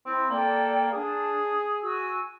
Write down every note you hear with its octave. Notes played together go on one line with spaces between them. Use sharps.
C4 E4
A#3 A4 D5 G5
D4 G#4
F#4 G#5 E6